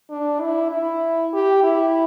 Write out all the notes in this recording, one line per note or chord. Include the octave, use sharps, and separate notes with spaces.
D4
E4
E4
G4
E4